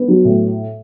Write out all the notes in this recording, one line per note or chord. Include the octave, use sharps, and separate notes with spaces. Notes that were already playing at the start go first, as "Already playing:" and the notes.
Already playing: B3
F#3
A2